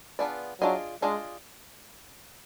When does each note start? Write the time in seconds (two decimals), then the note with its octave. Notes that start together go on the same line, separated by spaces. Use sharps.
0.19 B3 D4 F4 G#4 D5
0.61 F#3 D4 F4 G#4 D#5
1.02 G#3 D4 F4 G#4 D#5